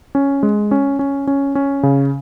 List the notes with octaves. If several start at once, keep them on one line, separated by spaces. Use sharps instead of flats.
C#4
G#3
C#4
C#4
C#4
C#4
C#3